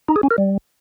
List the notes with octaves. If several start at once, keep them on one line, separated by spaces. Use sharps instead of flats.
D#4
G#4
C#4
A#4
G3